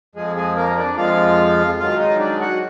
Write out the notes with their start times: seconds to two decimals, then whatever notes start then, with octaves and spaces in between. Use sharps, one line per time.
0.15 F2 F3 G#3 G#4
0.36 G#3 G#4
0.56 A#3 A#4
0.77 D4 D5
0.97 F2 F3 G#3 F4 F5
1.79 G#2 D#3 F#3 F4 F5
1.99 D#4 D#5
2.19 D4 D5
2.40 F#4 F#5